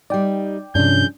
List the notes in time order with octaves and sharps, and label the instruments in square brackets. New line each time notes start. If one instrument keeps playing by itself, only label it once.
[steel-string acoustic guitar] G3 D#4 [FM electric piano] D5 G5
[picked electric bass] G2 C3 [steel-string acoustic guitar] F3 G#4 [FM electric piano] C#4 D4 [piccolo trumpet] G6